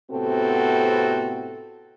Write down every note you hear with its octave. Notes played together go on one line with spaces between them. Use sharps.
A2 C3 B3 C4 F#4 A4